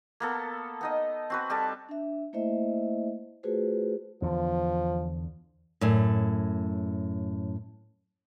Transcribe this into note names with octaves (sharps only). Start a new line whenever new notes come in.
A#3 B3 A4
B3 D#4 D#5
C4 F#4 B4
G3 G4 A4 A5
D4 E5
A3 A#3 E4 C5 D#5 E5
A3 F4 F#4 G#4 B4 C5
E2 D3 F3
F#2 A2